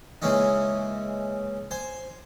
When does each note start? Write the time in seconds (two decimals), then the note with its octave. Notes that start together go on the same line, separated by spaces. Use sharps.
0.22 C#3 E3 G#3 A#3 C#4 D#4
1.71 C5 G#5